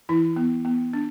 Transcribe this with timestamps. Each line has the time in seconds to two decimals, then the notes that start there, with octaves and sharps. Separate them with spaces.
0.09 E3 E4
0.36 B3
0.65 B3
0.93 D4